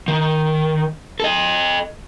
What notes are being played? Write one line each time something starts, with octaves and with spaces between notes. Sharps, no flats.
D#3
A4 D#5